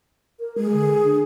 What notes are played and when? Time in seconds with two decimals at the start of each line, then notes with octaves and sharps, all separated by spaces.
0.40 A#4
0.58 G#3 G#4
0.73 D3
1.04 D4